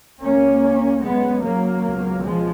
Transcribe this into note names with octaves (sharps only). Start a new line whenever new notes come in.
C#2 B2 A#3 C#4
F#2 C#3 G#3 B3
F#3 A#3
C#2 B2
F3 G#3